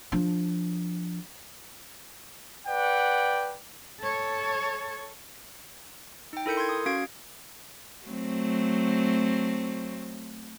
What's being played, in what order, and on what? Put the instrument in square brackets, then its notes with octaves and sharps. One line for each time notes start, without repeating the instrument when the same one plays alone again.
[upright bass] F3 D4
[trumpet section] B4 D5 F#5 G5
[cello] A4 C#5
[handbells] D#4 G5
E4 A4 A#4 G6 C#7
C6 G6 G#6
D#6
C#4 F#4 F5 G#6 D7
[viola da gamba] F#3 A3 C4